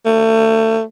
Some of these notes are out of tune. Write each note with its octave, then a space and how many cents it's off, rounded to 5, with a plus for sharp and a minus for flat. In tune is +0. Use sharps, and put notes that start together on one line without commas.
A3 +30